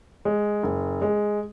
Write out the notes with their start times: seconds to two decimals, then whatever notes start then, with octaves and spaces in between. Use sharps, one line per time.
0.25 G#3
0.63 F#1
1.02 G#3